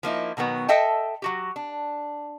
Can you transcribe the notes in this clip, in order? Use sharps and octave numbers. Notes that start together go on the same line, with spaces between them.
F3 A#3 D#4 E4
B2 D#3 F#3 B3
A4 D#5 E5 G5 A5
F#3 F#4 G4
D4